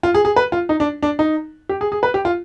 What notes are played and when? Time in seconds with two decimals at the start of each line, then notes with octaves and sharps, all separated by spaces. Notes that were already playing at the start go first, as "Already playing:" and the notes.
0.03 F4
0.14 G#4
0.25 G#4
0.36 B4
0.52 F4
0.69 D#4
0.80 D4
1.03 D4
1.19 D#4
1.69 G4
1.81 G#4
1.92 G#4
2.03 B4
2.14 G4
2.25 F4